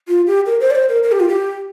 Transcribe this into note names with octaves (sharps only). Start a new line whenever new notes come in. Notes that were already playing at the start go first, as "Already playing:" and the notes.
F4
G4
A#4
C5
D5
C5
A#4
A#4
G4
F4
G4